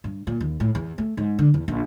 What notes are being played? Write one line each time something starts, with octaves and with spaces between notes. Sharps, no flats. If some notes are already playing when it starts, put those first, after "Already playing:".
G2
A#2
D#2
A2
E2
A3
G#2
D3
E2
A#1